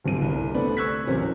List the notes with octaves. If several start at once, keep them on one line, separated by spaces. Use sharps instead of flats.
D1 G1 C3 D#7
G1 C2
A3 B3 C4 D4 A4 B4
C#6 E6 F#6 G#6 B6
D1 A1 C3 C#4 A#4 C5